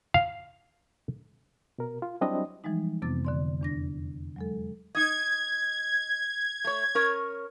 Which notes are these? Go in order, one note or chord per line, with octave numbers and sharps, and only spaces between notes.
F5
B2 A#4
F4
F#3 G3 C4 D4 E4 D#5
E3 F3 G3 G#3 D#4
F2 C3 B3 C4 D6 A6
D3 D5 C6
E2 D4 A#6
F#3 G#3 A4
D#4 D#5 G#6
A3 C#5
C#4 A#4 C#5